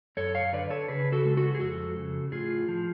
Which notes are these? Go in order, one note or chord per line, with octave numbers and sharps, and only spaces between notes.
F#2 A4 C#5
C#5 F5
D3 B4 D5
A4 C#5
C#3 G#4 B4
F#4 A4
G#3
F#4 A4
G#4
F2 F#4 A4
C#3
A2 F4 G#4
F3